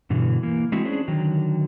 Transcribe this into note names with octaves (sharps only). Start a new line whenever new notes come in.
G2 B2 D3 E3
E3 A#3
G#3 C4 E4 F#4
C#4 D4 G#4 C5
D3 D#3 F#3